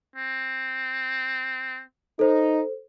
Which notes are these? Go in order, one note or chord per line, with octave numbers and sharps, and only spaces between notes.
C4
D#4 A4 C5